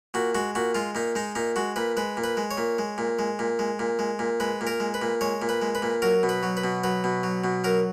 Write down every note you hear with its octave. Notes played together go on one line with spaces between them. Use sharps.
A#2 F#4
G#3 F#4
A#2 F#4
G#3 F4
A#2 D#4
G#3 D#4
A#2 D#4
G#3 F#4
A#2 B4
G#3 B4
A#2
B4
G#3
C#5
A#2
G#3
A#2
G#3
A#2
G#3
A#2
G#3
A#2
G#3 B4
A#2
A#4
G#3
B4
A#2
G#3 C#5
A#2
B4
G#3
B4
A#2
F#3 A#4
B2
B4
F#3
B4
B2
F#3 B4
B2
F#3
B2
F#3 A#4